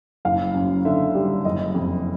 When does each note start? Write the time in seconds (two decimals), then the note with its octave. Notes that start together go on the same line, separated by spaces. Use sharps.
0.25 F#1 F5
0.54 F#2
0.85 D3 E5
1.15 G3
1.45 F#1 D#5
1.75 F2